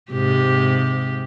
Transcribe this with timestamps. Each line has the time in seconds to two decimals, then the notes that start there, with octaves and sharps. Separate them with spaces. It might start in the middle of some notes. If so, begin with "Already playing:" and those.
0.11 G#2 C3 G4